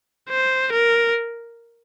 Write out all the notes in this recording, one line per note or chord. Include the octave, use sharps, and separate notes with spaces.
C5
A#4